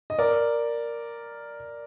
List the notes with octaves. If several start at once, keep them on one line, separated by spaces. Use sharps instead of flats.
D#5
A#4 D5